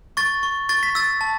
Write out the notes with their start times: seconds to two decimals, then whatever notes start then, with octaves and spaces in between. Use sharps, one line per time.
0.17 C#6 A6
0.43 C#6
0.69 C#6 A6
0.83 B6
0.95 E6 A6
1.21 A5